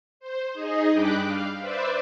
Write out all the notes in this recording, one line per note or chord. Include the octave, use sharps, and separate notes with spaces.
C5
D#4 G#4 D#5
G2 D4 G5 B5 D6 F#6
F5
B4 C5 D5 E5